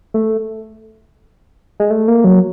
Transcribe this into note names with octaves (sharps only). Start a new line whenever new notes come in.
A3
G#3
A3
A#3
F#3